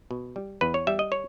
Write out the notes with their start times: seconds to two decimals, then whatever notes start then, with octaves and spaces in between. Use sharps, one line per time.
0.11 B2
0.36 G3
0.61 E2 B4
0.74 C#5
0.87 G3 E5
0.99 D#5
1.12 C#5